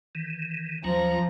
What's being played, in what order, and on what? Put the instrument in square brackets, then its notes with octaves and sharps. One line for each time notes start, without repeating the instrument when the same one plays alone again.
[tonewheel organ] D#3 E3
[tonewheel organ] D#2 F#3 C#4 [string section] F3 [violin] A#5